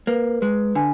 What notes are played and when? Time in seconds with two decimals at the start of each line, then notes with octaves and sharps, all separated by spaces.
0.07 A#3 B4
0.41 G#3 B4
0.75 D3 G#5